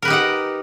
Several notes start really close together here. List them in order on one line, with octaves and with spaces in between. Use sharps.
A#4 B4 G4 D#4 F#5